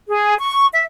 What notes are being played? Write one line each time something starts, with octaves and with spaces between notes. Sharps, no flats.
G#4
C#6
E5